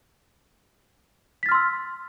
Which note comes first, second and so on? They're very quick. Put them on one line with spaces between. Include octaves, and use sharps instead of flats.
B6 A6 F6 C6 E6